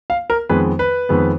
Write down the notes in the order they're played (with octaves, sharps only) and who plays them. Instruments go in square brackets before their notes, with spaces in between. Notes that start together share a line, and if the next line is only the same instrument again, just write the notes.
[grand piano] F5
A#4
F2 D#3 G#3 B3 B4
B4
F2 D#3 G#3 B3